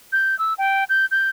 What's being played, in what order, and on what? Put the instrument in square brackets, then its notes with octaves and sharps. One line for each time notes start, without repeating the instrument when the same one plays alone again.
[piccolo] G6
E6
G5
G6
G6